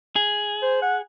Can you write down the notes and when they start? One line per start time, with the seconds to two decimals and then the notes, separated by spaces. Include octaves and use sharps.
0.16 G#4
0.63 C5
0.82 F#5